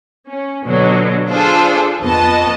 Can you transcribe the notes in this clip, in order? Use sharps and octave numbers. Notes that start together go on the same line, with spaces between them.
C#4
B2 D3 F#3
D4 F4 G#4 A4 C5
F2 B3 D#5 A5